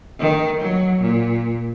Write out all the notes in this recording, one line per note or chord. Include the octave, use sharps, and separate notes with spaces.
D#3
F#3
A#2